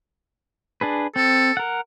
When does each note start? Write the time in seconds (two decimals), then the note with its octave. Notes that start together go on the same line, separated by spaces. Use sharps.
0.81 D4 G#4 B4
1.16 C4 A4
1.57 A#4 F#5